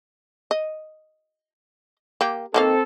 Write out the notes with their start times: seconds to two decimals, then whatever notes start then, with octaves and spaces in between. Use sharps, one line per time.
0.51 D#5
2.21 A#3 G4
2.54 D#3 A#3 C4 A4 F5